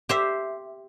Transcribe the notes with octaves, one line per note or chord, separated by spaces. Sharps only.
G4 C5 E5